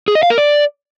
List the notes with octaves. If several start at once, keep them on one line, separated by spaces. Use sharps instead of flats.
G#4
D#5
F5
A#4
D5